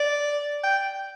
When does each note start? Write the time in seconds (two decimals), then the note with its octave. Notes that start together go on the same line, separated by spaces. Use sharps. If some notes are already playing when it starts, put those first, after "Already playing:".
Already playing: D5
0.63 G5